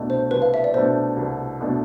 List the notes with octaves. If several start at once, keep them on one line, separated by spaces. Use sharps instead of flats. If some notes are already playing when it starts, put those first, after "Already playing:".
Already playing: C2 B2 A3 D4
C5
C2 B4
F5
E5
D5
B2 A3 D4 C5
C2
B2 A3 D4